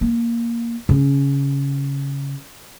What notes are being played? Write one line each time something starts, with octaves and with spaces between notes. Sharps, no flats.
A#3
C#3